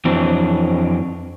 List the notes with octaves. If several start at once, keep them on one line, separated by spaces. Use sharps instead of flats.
F2 E3 F#3 C4 D4